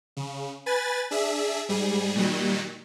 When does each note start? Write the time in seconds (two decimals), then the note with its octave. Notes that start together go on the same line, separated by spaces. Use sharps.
0.17 C#3
0.66 B4 G#5 A6
1.11 D4 G#4 E5
1.68 G#2 G3 G#4
2.15 A#2 D#3 F#3 G3